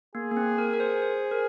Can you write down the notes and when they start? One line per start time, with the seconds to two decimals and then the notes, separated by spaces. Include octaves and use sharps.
0.15 A#3 G#4
0.31 A#3
0.37 C4
0.58 A#4
0.73 A#4
0.80 C5
1.02 C5
1.31 A#4